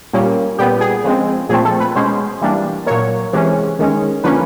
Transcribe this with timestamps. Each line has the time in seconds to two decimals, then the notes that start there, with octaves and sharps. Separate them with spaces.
0.13 A#2 G3 A#3 C#4
0.58 A#2 G3 B3 G4
0.81 G#4
1.04 C#3 F3 G#3 C4
1.49 A#2 F3 A3 C4 G#4
1.65 A4
1.80 B4
1.96 B2 G#3 C#4 C5
2.41 E3 G3 A#3 D4
2.86 A#2 F#3 A#3 C#5
3.33 C3 E3 G#3 C#4
3.79 D#3 G#3 C#4
4.24 D3 F3 A#3 C#4 B4